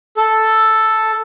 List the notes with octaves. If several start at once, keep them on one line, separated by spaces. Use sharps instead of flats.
A4